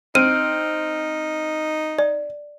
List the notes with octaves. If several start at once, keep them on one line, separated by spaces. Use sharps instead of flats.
C4 D#4 F6 D7 D#7
D5